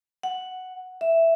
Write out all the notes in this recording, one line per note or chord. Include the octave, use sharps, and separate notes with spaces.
F#5
E5